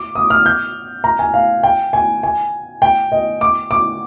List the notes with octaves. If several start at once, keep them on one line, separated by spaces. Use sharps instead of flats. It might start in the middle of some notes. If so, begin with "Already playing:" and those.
Already playing: D6
D#6
F6
G6
A#5
G#5
F5
G5
G#5
G#5
G5
D#5
D6
D6